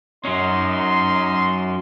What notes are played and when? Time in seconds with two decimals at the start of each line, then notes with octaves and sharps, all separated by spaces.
0.25 F#3 C#4 D#4 C6